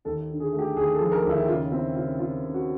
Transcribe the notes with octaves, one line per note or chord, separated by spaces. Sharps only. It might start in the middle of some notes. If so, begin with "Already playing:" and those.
D#2 A4
D3
G#4
A3
G4
D#2 G#4
A4
F3
A#4
D#2
E4
C#3 F4
C4 E4
C#3 F4
C4 F4
C#3
F#4